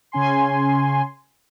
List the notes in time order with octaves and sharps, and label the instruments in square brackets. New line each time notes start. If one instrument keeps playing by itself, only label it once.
[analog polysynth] C#3 C#4 G#5 C6